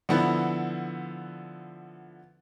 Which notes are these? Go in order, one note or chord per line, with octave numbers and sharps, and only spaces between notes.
D3 F3 B3 E4